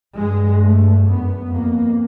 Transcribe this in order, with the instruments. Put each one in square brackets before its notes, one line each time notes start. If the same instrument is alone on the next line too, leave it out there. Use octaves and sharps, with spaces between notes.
[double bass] G2 [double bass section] G#3
[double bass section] A3
[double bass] F#2 [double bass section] B3
[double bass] F2 [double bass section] A#3